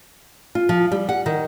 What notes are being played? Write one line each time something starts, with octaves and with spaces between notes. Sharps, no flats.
F4
F3
G3
F#5
D#3